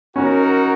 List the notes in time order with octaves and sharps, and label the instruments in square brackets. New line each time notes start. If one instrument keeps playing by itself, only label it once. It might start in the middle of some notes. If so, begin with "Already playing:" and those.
[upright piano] C#4 [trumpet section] D#4 F#4 A#4